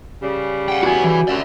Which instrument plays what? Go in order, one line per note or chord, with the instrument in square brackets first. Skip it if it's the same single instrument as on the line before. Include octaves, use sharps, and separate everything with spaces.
[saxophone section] C#3 G3
[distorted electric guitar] F#5 G5
[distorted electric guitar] B3 E4 [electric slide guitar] F#4 G#5
[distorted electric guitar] E3
[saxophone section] F#2 C3 [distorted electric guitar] D5 E5